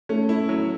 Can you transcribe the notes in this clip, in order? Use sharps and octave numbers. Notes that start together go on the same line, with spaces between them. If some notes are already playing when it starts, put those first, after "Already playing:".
A3 C#4
E4
F#3